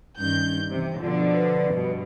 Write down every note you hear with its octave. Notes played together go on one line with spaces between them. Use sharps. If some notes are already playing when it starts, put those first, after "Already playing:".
G2 D#3 C#4 G6
C3 E3
B2 D3 F3 F4
B4
G2 B2